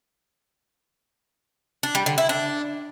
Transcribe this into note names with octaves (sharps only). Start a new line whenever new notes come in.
D4
G3
D3
E4
D4